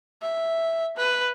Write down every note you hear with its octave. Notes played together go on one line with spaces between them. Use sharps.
E5
B4